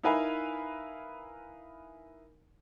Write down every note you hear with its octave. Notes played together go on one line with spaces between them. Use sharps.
D#4 E4 A#4 B4 F5 G#5